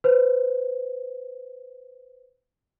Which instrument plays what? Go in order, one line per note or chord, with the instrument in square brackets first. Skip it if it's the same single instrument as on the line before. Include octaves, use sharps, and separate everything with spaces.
[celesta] B4 C5